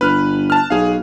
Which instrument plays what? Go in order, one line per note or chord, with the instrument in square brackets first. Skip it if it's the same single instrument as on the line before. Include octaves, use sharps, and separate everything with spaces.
[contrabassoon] G1 [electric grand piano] B4 F6 F#6
[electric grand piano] A5 F6
[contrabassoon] B1 [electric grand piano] G#4 F5